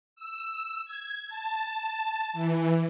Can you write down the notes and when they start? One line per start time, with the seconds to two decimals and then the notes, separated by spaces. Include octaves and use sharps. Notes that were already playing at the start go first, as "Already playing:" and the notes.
0.16 E6
0.85 G#6
1.28 A5
2.33 E3